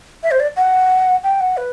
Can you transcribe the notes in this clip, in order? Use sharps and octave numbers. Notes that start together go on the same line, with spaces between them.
E5
C5
D5
F#5
G5
F#5
B4